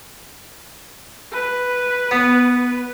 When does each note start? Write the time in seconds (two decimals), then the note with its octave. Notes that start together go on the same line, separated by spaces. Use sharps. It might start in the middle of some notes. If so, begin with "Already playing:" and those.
1.32 B4
2.11 B3